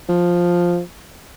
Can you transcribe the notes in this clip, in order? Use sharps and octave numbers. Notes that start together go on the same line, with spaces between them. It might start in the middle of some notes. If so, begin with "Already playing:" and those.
F3